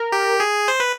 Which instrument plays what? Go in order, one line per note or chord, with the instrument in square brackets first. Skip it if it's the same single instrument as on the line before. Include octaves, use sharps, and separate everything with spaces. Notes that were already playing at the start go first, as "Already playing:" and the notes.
Already playing: [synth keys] A#4
[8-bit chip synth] G4
G#4
C5
B4